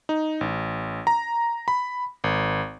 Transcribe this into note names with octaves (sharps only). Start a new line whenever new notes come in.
D#4
A1
A#5
B5
G#1